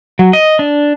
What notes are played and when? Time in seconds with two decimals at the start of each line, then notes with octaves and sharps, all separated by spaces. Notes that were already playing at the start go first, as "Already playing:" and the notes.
0.19 F#3
0.33 D#5
0.59 D4